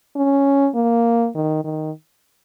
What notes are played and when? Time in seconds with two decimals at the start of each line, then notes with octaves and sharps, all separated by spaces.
0.16 C#4
0.75 A#3
1.35 D#3
1.64 D#3